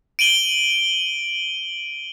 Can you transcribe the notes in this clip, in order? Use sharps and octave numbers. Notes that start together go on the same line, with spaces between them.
D7 D#7 F#7 G7